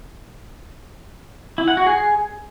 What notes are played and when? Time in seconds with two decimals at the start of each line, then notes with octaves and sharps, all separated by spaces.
1.58 E4
1.68 F#5
1.77 F#4
1.87 G#4